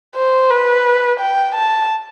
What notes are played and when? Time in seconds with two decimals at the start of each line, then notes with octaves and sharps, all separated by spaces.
0.16 C5
0.50 B4
1.20 G5
1.55 A5